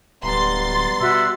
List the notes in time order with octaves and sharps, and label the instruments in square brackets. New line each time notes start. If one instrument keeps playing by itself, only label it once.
[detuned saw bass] D1 [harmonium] G3 B3 A#5 [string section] C6 A6
[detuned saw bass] B2 [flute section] F#4 E5 E6